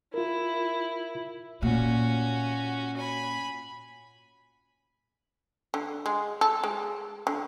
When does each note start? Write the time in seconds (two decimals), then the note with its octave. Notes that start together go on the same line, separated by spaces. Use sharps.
0.14 E4 F4 A#4
1.62 A#2 C#4 F#4
2.97 G#5 B5
5.74 D3
6.06 G#3
6.41 A4
6.64 G#3
7.27 D3